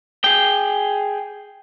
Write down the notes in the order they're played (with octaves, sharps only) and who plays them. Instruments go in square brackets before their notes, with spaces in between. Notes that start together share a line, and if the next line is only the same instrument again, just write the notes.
[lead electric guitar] G#4 G5